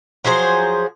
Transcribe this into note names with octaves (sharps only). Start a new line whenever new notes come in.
F3 F#3 G#4 C5